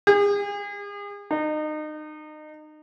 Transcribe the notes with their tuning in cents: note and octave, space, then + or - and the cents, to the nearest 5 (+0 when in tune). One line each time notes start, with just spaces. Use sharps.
G#4 -40
D#4 -30